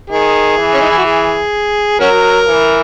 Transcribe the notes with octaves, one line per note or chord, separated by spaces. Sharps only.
D#3 G#4
E3
C#4
D#4
E4
F#4
G#4
F#3 C#4 F#4 A#4
E3